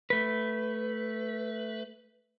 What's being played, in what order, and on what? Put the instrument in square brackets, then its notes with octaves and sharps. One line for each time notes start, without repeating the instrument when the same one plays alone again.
[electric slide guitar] A3 B4